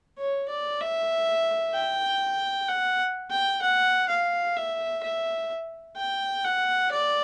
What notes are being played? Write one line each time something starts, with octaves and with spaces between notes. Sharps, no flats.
C#5
D5
E5
G5
F#5
G5
F#5
F5
E5
E5
G5
F#5
D5